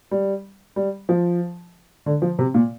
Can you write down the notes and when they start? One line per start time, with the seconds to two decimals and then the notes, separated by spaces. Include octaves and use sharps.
0.11 G3
0.76 G3
1.09 F3
2.06 D3
2.22 F3
2.39 C3
2.54 A#2